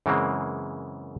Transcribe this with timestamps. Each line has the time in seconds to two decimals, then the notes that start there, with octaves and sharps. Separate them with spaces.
0.06 F#2 C#3 E3 G#3 A#3 C4